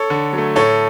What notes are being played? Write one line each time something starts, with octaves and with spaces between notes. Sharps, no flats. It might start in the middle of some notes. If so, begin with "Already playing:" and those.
Already playing: A4 C#5
D3
F#3
A3
A2 A4 C#5